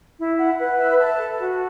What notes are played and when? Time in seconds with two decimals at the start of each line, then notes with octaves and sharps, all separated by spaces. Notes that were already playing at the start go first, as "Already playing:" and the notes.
0.17 E4
0.38 F#5
0.59 B4
0.79 E5
0.99 A5
1.19 A4
1.39 F#4